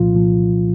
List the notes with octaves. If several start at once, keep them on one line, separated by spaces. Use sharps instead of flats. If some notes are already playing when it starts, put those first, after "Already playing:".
Already playing: C2 A#2 F3 F4
C2 A#2 F3